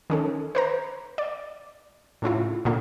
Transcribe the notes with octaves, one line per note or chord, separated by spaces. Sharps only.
D#3 C#4 A4
B4 C5 A#5
D5
A2 C#3 E4 F4
A#2 D3 A#3 D4